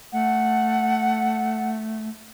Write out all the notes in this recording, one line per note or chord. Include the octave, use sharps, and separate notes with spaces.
A3 F#5